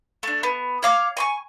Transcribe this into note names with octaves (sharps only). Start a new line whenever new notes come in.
A3 D4
B3
C#5 F5 D6
G#5 C6 C#6